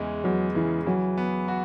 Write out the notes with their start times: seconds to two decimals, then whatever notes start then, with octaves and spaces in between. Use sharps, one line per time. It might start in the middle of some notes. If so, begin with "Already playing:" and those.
Already playing: E2 C#3 E3 G#3
0.24 E2 F#3
0.55 C#3 E3
0.86 E3 F#3
1.17 B3
1.48 F#4